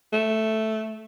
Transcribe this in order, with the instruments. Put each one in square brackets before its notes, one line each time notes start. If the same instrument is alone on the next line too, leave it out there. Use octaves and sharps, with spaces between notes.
[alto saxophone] A3